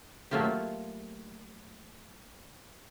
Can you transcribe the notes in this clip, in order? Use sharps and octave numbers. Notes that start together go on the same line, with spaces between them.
F#3 A3 A#3 F4 G4